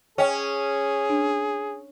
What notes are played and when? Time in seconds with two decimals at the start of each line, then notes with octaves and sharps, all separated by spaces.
0.18 C#4 G#4 C#5 D#5 G5
1.10 D4